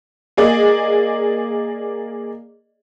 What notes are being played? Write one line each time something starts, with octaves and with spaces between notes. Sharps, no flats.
A#3 G#4 D5 D#5